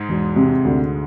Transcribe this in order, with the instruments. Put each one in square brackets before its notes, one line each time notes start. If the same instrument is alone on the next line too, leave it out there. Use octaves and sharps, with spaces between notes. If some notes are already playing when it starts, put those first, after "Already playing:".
Already playing: [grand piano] G#2 G#3
[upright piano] E1
C3
D2